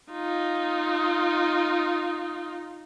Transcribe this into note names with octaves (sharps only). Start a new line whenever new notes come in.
D#4 F4